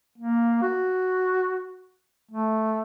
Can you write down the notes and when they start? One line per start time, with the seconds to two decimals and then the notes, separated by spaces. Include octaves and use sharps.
0.18 A#3
0.62 F#4
2.31 A3